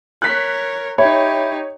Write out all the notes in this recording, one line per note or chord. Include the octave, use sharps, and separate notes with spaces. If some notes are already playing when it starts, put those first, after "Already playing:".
A#4 C#5 F#6 B6
D#4 G4 C#5 E5 B5 G#6